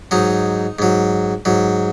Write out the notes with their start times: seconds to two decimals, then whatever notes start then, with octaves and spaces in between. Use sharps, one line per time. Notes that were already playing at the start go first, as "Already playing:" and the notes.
0.11 G#2 F#3 D#4
0.79 G#2 F#3
1.45 G#2 F#3